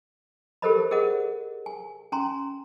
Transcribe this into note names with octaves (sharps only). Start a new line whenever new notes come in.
G4 A4 A#4 C5 D#5 B5
G#4 A#4 C5 D#5 F#5
G#5
C#4 G#5 A#5 C6